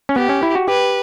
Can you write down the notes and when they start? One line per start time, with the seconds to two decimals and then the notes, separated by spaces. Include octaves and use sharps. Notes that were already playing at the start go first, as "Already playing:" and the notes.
0.09 C#4
0.16 B3 G4
0.29 C#4
0.43 E4
0.55 F#4
0.68 G4 B4